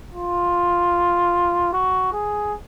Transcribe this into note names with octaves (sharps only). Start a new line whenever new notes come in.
F4
F#4
G#4